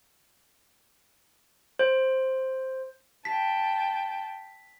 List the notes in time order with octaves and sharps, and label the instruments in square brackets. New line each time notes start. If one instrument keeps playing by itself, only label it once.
[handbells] C5
[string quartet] G5 A5 [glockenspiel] B6